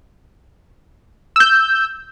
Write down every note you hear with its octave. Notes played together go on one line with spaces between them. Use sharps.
E6 G6